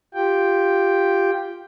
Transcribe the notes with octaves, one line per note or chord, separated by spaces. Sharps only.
F4 G4 G5